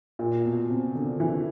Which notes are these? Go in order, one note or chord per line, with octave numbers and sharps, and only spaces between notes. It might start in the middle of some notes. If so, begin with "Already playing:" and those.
A#2
B2
C3
D3
E3